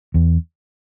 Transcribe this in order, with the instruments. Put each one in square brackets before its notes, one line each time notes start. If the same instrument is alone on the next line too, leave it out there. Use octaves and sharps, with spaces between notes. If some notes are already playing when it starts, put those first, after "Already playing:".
[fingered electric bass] E2